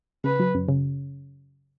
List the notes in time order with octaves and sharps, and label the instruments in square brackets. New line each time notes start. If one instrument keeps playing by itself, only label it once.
[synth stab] C#3 [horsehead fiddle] B4
[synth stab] F#3
F#2
C#3